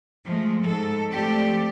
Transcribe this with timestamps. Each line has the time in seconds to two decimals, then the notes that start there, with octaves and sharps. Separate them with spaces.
0.25 F3 G#3 A3
0.62 G#2 A4
1.10 F3 A3 C4 G4 A4 D5